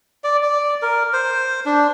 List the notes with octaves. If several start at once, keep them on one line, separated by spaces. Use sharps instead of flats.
D5
D5
A#4
C5
D4